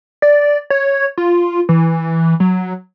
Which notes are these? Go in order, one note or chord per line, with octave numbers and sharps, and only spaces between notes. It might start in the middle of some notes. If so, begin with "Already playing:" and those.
D5
C#5
F4
E3
F#3